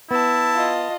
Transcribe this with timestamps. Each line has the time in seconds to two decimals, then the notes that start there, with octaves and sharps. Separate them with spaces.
0.11 B3 E4 A5
0.55 F4 D#5